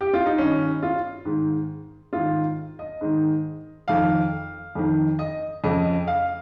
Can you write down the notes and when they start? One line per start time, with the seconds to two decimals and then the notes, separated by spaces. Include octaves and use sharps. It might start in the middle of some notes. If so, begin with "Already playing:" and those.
0.01 G4
0.13 F4
0.26 D#4
0.38 G2 D#3 C#4
0.83 F4
1.25 G#2 D#3
2.13 G#2 D#3 F4
2.79 D#5
3.01 G#2 D#3
3.88 F2 D#3 F5
4.75 F2 D#3
5.19 D#5
5.64 F2 C#3 D#5
6.07 F5